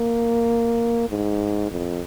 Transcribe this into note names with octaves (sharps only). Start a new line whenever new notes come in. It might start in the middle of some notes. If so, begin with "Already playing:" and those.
Already playing: A#3
G#2
F2